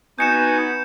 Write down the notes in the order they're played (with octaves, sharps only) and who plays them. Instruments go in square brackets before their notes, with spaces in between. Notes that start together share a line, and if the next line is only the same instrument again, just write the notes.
[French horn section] B3 [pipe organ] D#4 F#4 G#5 [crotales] G6 C#7 E7